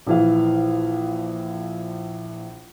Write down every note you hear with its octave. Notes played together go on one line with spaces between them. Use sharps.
A#1 E3 F5